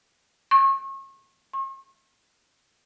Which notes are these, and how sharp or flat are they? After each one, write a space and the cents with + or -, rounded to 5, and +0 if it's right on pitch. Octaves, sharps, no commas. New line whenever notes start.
C#6 -35
C#6 -45